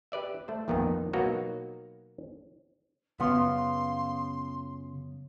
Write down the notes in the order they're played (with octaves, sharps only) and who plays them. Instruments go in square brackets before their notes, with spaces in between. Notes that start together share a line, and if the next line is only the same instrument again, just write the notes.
[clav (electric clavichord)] G4 B4 D5 E5
A3 C5
A#1 F2 A#2 D#3 B3 D#4
B2 F#3 A#3 B3 D#4 F#4
[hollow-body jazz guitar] F#2 B3 [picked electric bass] C#3 [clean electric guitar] F4 [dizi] C6